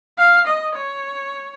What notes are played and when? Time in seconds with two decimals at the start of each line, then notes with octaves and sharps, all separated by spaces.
0.19 F5
0.47 D#5
0.76 C#5